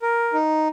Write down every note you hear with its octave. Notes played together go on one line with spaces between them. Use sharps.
A#4
D#4